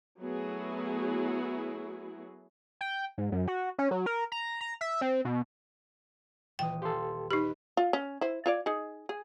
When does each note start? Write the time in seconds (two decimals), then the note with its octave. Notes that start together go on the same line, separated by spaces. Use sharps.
0.20 F#3 A3 B3 E4 F#4 G#4
2.81 G5
3.18 G#2
3.32 F#2
3.48 F#4
3.78 C#4
3.91 F#3
4.06 A#4
4.32 A#5
4.61 A#5
4.81 E5
5.01 C4
5.25 B2
6.59 D#1 E3 G5 D#6
6.82 G4 A4 F5 C6 C#7
7.31 D#4 G4 B4 D#5 B5
7.77 F4
7.93 C#4
8.21 E4 C5
8.46 F4 C#5 D5
8.66 D#4 G#4
9.09 G#4